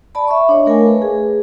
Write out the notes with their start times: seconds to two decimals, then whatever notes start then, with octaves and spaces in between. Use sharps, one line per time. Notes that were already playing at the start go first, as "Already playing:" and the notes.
0.15 D5 A5 B5
0.28 E5 C#6
0.49 D4 C#5 D#5
0.66 A3 A#4 F5 G#5
0.86 B4
1.02 G#4